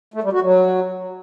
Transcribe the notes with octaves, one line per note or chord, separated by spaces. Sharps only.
A3
G3
F#4
F#3